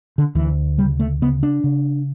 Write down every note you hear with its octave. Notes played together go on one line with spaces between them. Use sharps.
D3
D2 E3
C#3 G3
A3
C#3 B3
D4
C#3